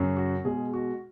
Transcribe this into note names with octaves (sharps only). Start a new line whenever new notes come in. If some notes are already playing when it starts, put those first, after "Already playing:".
Already playing: F#2 C#3 F#3
F#4
B2 G#3 G#4
F#4